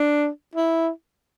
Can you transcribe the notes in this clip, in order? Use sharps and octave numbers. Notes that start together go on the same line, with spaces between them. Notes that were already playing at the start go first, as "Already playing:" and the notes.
Already playing: D4
E4